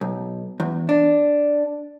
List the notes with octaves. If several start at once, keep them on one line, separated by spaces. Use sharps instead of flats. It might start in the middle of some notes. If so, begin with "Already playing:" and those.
B1
E2
D4